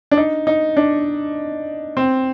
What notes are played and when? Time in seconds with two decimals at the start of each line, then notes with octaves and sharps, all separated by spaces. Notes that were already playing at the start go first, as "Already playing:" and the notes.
0.11 D4
0.17 D#4
0.47 D#4
0.77 D4
1.97 C4